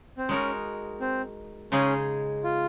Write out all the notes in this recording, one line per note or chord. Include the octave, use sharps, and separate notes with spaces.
C4
G#3 C#4 D#4 F#4 A#4
C4
C#3 G#3 C#4 D#4 G#4
F4